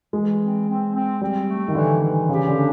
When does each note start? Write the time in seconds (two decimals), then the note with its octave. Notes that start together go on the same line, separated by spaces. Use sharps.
0.13 E3 G#3
0.41 C4
0.68 C4
0.94 C4
1.21 G3 C4
1.49 A3
1.68 D#3
1.75 D3 E3
2.02 E3
2.29 C#3 G4
2.47 D3
2.56 D4